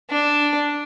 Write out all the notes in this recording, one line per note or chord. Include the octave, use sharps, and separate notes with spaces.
D4